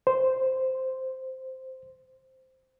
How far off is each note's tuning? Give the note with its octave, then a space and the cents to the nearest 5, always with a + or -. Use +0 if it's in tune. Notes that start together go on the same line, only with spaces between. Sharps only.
C5 -5